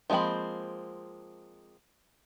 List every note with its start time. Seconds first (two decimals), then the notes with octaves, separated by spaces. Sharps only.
0.10 F3 G#3 A#3 C4 B5